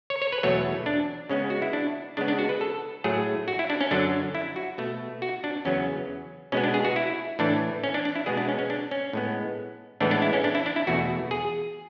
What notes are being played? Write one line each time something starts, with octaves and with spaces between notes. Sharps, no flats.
C#5
C#5
B4
E2 B2 F#3 A3 C#5
D4
C#3 G#3 B3 C#4
F#4
E4
D4
C#3 G#3 B3 D4
D4
F#4
B4
A4
A2 F#3 A3 G#4
F#4
E4
D4
C#4
F#2 D3 F#3 D4
E4
F#4
B2 A3
F#4
D4
E2 C#3 F#3 B3 C#4
B2 G#3 B3 C#4
D4
G#4
F#4
E4
A2 E3 A3 D4
C#4
D4
D4
E4
B2 G#3 B3 G#4
D4
C#4
C#4
D4
C#4
A2 G#3 B3
A2 E3 G#3 B3 D4
D4
E4
C#4
D4
E4
D4
E4
E2 B2 A3 F#4
G#4